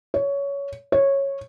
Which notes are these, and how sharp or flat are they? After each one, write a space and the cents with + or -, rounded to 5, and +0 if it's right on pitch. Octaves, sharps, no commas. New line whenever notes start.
C#5 +15
C#5 -10